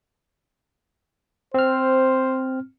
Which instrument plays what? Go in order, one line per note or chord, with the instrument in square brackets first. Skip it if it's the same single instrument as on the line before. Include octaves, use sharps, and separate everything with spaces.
[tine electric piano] C4 F6 [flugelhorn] C5